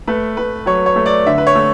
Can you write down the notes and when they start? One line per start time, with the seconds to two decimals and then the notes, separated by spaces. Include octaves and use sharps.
0.07 A3 B4
0.37 A3 B4
0.66 F#3 C#5
0.86 C#5
0.96 A3
1.06 D5
1.26 D3 E5
1.38 B4
1.47 C#5
1.55 A3